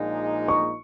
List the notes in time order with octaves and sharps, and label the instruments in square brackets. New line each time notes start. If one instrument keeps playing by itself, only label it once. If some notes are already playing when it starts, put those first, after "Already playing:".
Already playing: [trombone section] A#1 A#2 G#3 D#4
[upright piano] C#6